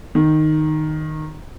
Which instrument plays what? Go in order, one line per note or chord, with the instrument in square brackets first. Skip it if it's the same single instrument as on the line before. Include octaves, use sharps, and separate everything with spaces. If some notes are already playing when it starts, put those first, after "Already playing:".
[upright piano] D#3